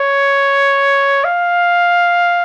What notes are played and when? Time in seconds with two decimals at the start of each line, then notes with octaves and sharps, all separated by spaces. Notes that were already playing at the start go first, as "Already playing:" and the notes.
Already playing: C#5
1.25 F5